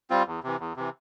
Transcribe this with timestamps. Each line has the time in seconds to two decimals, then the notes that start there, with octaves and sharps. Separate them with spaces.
0.10 G3 C4 F4
0.26 E2
0.43 C3 E3
0.60 E2
0.76 C3 E3